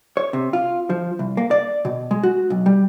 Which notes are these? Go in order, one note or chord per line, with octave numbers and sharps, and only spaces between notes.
C#5
C3
F4
F3
C2
A#3
D5
B2
G#3
F#4
B1
G3